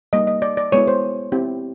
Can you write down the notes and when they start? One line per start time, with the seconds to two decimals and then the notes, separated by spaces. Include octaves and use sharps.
0.13 G3 A#3 D#4 D#5
0.27 D#5
0.42 D5
0.57 D5
0.72 G#3 B3 E4 C#5
0.88 C5
1.32 C4 E4 G4